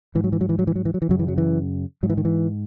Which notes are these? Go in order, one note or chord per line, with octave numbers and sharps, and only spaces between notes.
G#2 E3
F#3
E3
F#3
E3
F#3
E3
F#3
E3
F#3
E3
F#2 C#3 F#3
E3
F#3
E3
G#2 F#3
E3
D#3
E3